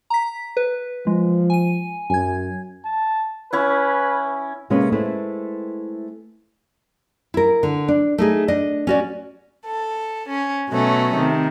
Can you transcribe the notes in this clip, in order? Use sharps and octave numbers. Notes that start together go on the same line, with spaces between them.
A#5 B6
B4
F3 G#3
G#5 D#7
F#2 G#5 G#6
A5
C#4 E4 B4
C3 G#3 A#3 C#4 B4
G#3 A3 C4 E4 B4
E4 A#4
D3
D4
A3 D#4 G#4
D4 D#5
C#4 F#4 D5
A4
C#4
B2 F#3 A3 C#4
C3 D#3